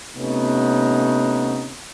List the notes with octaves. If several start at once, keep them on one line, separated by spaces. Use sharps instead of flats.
C3 A3 B3 C#4 D#4